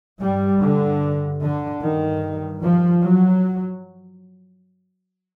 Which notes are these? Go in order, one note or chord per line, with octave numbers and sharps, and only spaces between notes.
G2 G3
D3
D3
G2 D#3
F3
F#3